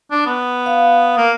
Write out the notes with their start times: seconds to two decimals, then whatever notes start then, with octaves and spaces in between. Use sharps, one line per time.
0.11 D4
0.26 B3
0.66 F5
1.18 A#3